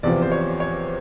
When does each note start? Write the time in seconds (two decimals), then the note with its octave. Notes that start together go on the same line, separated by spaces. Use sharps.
0.03 E2 C3 F3 D5
0.22 C5
0.32 C#5
0.60 C#5